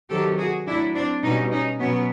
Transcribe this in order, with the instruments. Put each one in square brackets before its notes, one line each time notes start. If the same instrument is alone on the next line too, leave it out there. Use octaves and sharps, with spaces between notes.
[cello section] C3 D#3 F#3 G4 A4
F#4 G#4
A2 F#3 D4 E4
C4 D4
B2 G3 C#4 D#4
C#4 D#4
B2 F#3 B3 C#4